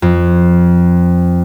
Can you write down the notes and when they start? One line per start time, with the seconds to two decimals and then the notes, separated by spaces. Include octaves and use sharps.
0.02 F2